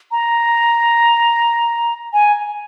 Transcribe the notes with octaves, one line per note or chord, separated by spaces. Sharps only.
A#5
G#5